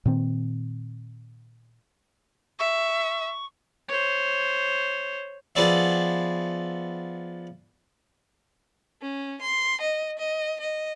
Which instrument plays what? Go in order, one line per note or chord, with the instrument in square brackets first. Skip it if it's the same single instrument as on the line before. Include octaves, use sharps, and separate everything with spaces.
[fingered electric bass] A#2 D#3 C4
[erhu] E5 [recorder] C#6
[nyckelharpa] C5 C#5
[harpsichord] F3 B3 G#4 D5 E5
[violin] C#4
C6
D#5
D#5
D#5